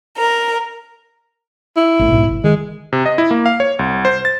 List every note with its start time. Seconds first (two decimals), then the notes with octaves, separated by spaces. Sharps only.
0.16 A#4
1.77 E4
1.99 A1 A2
2.11 B1 G#2 B2
2.27 G1
2.44 D#3 G#3
2.93 C3
3.06 D#5
3.18 E4
3.31 A#3
3.46 F5
3.60 C#5
3.79 C2
4.05 C5
4.25 A6